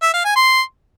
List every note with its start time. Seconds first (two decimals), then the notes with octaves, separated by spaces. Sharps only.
0.02 E5
0.14 F5
0.25 G#5
0.36 C6